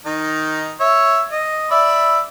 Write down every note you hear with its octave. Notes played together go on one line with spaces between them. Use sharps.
D#3 D#4
C#5 E5
D#5
D5 E5 B5